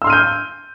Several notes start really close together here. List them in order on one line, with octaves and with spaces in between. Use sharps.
E6 C6 F6 D#7 G6